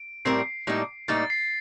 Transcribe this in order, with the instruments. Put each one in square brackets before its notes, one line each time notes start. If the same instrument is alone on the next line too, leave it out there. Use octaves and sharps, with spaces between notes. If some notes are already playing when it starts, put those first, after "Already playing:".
Already playing: [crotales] D7
[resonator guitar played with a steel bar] A2 G3 C4 G4 A#4 [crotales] C7
[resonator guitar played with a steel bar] A2 G3 A#3 D#4
[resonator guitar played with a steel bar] A2 G3 A#3 D#4 [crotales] A6
[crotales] C7